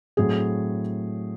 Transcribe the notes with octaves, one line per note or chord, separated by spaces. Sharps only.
A2 F#3 C4 G#4